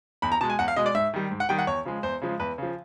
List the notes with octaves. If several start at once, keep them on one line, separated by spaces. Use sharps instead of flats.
E2 B5
A#5
B2 G#3 A5
G#5
E2 F#5
F5
B2 G#3 D#5
D5
G#2 E5
D#3 G3
G#2
F#5
D#3 G3 G5
F#5
E2 C#5
C#3 F3 G#3
E2 C5
C#3 F3 G#3
E2 B4
C#3 F3